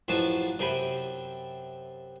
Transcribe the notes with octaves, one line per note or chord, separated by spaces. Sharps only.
A1 F#2 F3 F#4 G#5 A5
F#2 C3 G5 G#5 B5